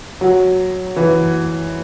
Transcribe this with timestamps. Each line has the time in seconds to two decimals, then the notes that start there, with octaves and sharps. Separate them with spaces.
0.21 F#3
0.97 E3